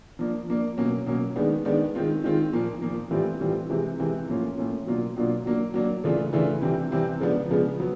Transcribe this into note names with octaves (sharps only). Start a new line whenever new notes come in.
F3 A#3 D4
F3 A#3 D4
B2 F#3 A#3 C#4
B2 F#3 A#3 C#4
D#3 G#3 B3 D4
D#3 G#3 B3 D4
D#3 G#3 C4 F4
D#3 G#3 C4 F4
A#2 F3 A#3
A#2 F3 A#3
A2 E3 G3 C4 F4
A2 E3 G3 C4 F4
C3 E3 G#3 C4
C3 E3 G#3 C4
A2 F3 A#3 C#4 F4
A2 F3 A#3 C#4 F4
B2 F#3 A#3 D4 F4
B2 F#3 A#3 D4 F4
F#3 A#3 D4
F#3 A#3 D4
C#3 E3 A3 D4 F4
C#3 E3 A3 D4 F4
C3 E3 G3 C4
C3 E3 G3 C4
C#3 F3 G#3 B3 D4
C#3 F3 G#3 B3 D4
F#3 B3